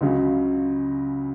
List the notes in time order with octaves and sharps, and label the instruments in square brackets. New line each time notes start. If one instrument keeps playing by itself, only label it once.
[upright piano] C#2 C#3 F#3